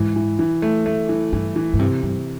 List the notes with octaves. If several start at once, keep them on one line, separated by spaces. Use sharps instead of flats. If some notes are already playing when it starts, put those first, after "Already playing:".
Already playing: G#2 E3
E3
E3
A3
A3
E3
G2 E3
E3
G#2
G2 C3
G2 C3